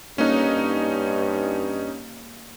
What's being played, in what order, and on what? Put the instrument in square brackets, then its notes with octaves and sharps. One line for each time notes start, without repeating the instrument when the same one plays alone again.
[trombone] G2 [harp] A#3 A4 F#6 [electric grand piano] C#4 D#4